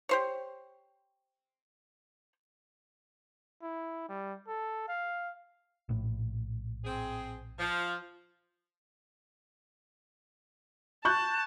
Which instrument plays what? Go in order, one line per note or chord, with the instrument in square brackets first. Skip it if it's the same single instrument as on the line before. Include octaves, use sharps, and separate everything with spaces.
[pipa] G4 C5 C#5
[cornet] E4
G3
A4
F5
[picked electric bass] A#1 A2
[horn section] C4 G#4
F3
[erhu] A5 [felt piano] C#6 F#6 G6